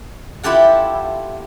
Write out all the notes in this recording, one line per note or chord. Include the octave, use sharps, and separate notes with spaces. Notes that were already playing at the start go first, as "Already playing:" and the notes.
E4 F4 G4 A4 F#5